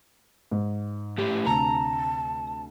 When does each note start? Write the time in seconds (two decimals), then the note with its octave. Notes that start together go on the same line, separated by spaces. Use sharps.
0.51 G#2
1.18 A2 G4
1.46 D2 C3 A5 A#5